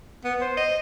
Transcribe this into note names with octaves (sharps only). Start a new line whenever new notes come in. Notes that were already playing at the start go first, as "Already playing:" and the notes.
B3
C5
D#5